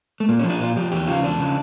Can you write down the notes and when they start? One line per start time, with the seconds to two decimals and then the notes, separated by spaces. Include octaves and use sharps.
0.20 A3
0.28 A#2 A#3
0.39 F3 C#4
0.50 D4
0.60 A#2 F4
0.76 F3 G4
0.92 E2 G4
1.08 C#3 F3 F4
1.23 E2 D4
1.39 C#3 F3